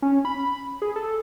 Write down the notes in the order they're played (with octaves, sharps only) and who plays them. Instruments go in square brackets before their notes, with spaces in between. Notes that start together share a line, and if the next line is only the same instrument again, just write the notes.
[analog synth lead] C#4
B5
G#4
A4